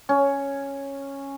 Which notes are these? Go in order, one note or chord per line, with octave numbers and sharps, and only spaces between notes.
C#4